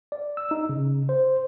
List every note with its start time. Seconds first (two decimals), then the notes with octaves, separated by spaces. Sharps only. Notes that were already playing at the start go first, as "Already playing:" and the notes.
0.12 D5
0.37 E6
0.51 D#4
0.69 C#3
1.09 C5